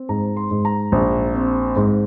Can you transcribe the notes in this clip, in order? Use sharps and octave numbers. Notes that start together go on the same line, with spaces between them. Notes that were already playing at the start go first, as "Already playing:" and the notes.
Already playing: C4
G#2 A#5
C6
G#2
A#5
A#1
C4
G#2